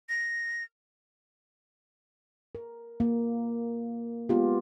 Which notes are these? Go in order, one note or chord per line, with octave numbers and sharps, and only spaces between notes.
A#6
A#4
A#3
G#3 B3 F4 G4